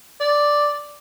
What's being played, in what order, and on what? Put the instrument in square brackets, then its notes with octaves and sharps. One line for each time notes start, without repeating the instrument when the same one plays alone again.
[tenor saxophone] D5